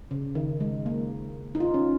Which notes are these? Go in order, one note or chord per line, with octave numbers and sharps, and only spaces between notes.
C#3
D#3
G#3
A#3
D#4
F4
C#4